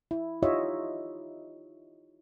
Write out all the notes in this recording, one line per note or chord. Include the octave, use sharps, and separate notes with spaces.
E4
D#4 F4 G4 C#5 D#5 E5